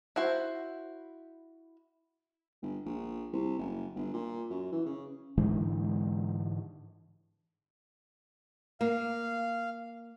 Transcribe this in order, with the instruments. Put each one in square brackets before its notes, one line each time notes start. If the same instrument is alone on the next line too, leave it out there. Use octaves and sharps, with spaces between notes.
[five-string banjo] E4 F#4 C5
[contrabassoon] G1
A#1
C2
F#1
G1
A#2
F#2
E3
C#3
[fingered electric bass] G#2 D3 E3 G#3
[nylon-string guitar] A#3 [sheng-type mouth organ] F5